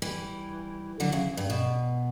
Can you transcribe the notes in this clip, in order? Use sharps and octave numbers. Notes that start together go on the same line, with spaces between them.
E3 G3
D3 F#3
C#3 E3
G2
B2